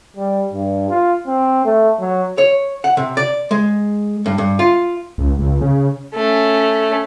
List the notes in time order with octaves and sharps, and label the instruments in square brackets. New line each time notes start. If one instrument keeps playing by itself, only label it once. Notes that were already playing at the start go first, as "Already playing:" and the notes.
[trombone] G3
G2
F4
C4
A3
F#3
[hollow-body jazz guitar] C#5
F#5
C3
D5
G#3
G2
G2
F4
[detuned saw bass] C#2
C#2
C#3
[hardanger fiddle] A3 C#4